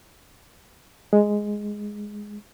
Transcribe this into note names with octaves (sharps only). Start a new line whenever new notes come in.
G#3